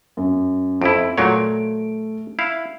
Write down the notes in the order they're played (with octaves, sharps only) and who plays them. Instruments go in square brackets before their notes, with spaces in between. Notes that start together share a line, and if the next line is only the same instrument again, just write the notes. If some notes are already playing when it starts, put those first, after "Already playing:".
[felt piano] F#2
[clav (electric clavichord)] F2 E4 [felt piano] D7
[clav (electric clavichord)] A#2 F#3 C#5 [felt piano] A3 D7
[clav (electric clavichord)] E4 F5